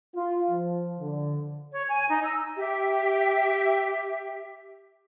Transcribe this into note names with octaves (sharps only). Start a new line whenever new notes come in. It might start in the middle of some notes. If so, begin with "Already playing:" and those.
F4
F3
D3
C#5
G#5
D#4
E6
G4 E5